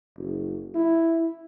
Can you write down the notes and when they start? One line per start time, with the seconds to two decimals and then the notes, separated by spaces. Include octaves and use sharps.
0.16 F#1
0.75 E4